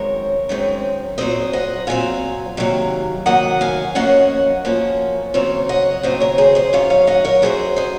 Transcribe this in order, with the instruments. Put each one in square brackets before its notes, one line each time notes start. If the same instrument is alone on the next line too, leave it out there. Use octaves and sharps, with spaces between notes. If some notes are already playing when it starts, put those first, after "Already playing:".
Already playing: [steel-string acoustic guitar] F#2 D#3 G#3 C4 A#4 C#5
F#2 D#3 G#3 C4
A#2 F#3 C4 C5 D#5
D#5 F#5
A#2 F#3 C4 F5 G#5
C3 D#3 F#3 A#3
C3 D#3 F#3 A#3 D#5 F#5
F5 G#5
F#2 F3 A#3 C#4 D#5 F#5
F#2 F3 A#3 C#4
D#2 C#3 F#3 C4 C#5 F5
D#5 F#5
D#2 C#3 F#3 C4 C5 D#5
A#4 C#5
G#4 C5
C5 D#5
F#2 D#3 F#3 C#5 F5
C#5 F5
D#5 F#5
A#4 C#5
F#2 D#3 F#3 G#4 C5
C5 D#5